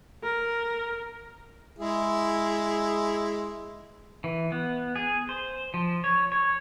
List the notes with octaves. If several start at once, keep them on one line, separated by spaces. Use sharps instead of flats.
A#4
G#3 E4 G#4
E3
B3
G#4
C5
F3
C#5
C#5